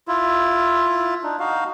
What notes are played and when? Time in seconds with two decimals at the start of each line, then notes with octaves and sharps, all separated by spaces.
0.08 E4 F4
1.23 D4 D#4
1.40 D#4 F#4 F5